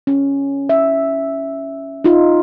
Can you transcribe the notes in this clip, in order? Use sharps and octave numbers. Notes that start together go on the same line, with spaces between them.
C#4
E5
D#4 F4